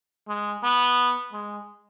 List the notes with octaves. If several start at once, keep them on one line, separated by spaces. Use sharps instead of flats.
G#3
B3
G#3